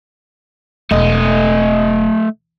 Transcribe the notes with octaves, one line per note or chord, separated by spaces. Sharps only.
E1 A3 D#5